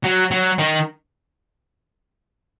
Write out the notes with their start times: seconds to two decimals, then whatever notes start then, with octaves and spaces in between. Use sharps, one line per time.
0.04 F#3
0.31 F#3
0.58 D#3